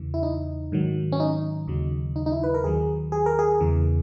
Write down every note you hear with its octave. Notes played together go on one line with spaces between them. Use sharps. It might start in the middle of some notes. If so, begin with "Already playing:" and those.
Already playing: E2 C#3 E3
E4
D#4
G#2 D#3 F#3
C#4
D#4
D#2 C#3 F#3
D#4
D#4
E4
B4
A#4
D#2 D#3 F#3 G#4
G#4
A#4
G#4
E2 C#3 E3